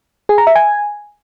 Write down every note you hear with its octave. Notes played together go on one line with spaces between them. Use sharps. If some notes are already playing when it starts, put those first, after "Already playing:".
G#4
A#5
E5
G#5